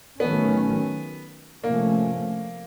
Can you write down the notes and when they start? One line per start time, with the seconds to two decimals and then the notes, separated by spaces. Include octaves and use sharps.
0.20 D#3 F#3 A3 B3 C#4
1.64 C3 F3 A3 A#3 C#4